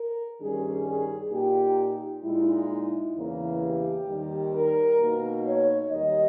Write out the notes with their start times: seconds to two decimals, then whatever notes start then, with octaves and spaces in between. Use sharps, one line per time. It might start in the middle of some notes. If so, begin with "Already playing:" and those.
Already playing: A#4
0.39 G2 D#3 G3 C#4 G#4
0.85 G#4
1.31 A#2 A#3 D#4 G4
2.23 A#2 G#3 D#4 E4
2.69 E4
3.14 E2 C#3 E3 A#3
3.61 G4
4.07 D#2 D#3 G3
4.52 A#4
4.99 B2 A#3 D#4
5.45 C#5
5.90 D#2 D#3 G3 D#5